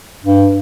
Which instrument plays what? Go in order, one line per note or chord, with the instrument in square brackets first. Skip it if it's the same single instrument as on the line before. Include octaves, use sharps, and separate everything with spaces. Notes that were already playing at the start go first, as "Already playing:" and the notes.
[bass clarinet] G2